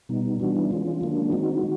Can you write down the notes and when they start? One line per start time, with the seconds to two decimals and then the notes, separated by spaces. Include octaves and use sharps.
0.09 B2 G3 B3 D#4
0.40 E3 G3 B3 D4 F#4
0.56 E4
0.71 E3 G#3 C#4 F4
1.01 D#3 F#3 A#3 D4
1.32 D#3 G#3 C4 D#4 F#4